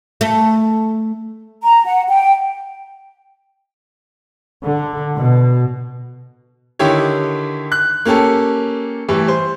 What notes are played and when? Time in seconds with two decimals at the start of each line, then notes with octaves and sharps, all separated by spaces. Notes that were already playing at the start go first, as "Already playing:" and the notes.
0.21 A3
1.63 A#5
1.85 F#5
2.09 G5
4.65 D3
5.16 B2
6.79 D3 D#3 E4 G4 C#5
7.72 F#6
8.05 A#3 C#4 G4 A4
9.09 A2 E3 G3
9.28 C5